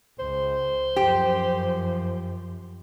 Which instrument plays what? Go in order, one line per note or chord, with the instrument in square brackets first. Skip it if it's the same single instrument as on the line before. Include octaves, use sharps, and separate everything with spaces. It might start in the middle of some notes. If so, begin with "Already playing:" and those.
[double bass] C#2 [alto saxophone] C5
[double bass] F#2 F3 [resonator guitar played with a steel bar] G4